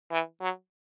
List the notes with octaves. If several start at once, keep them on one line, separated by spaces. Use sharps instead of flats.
E3
F#3